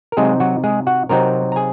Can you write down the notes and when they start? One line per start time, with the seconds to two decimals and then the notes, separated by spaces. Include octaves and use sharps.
0.12 A#4
0.17 C3 F#3 G#3 C4 D#4 G#4
0.40 F#3 F#4
0.64 G#3 G#4
0.87 F#4 F#5
1.09 C3 F#3 C4 D#4 A#4 A#5
1.52 A#5
1.56 G#4 G#5